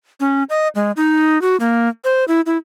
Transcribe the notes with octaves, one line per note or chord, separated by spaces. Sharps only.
C#4
D#5
G#3
D#4
F#4
A#3
C5
E4
E4